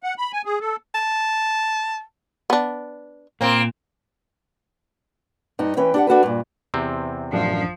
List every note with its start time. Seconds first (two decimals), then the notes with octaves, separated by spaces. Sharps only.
0.03 F#5
0.18 B5
0.33 G#5
0.45 G#4
0.60 A4
0.94 A5
2.50 B3 D4
3.41 A#2 A#3 C4
5.59 G2 D#4
5.77 E3 C#4 B4 G5
5.94 D4 G4 F#5
6.07 D4 F#4 A4 B4
6.23 G2 A#2
6.74 E2 C3 C4
7.32 A1 F#2 F3 D4